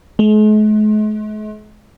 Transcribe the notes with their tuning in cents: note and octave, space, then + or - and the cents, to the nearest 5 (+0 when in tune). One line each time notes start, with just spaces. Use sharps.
G#3 +45